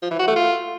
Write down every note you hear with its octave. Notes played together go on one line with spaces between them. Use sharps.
F3
E3
F#4
A3
F4